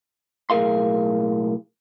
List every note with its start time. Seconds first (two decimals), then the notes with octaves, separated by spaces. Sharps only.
0.50 B1 A2 G#4 A#4 F5 C6